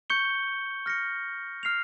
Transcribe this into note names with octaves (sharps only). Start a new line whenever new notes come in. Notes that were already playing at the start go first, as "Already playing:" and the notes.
C#6 G6 C#7 G7
F6 A#6 C#7
F6 C7 F7